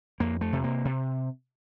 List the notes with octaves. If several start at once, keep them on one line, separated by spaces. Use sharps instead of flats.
F2 A#3
A3
C3
A#3
C3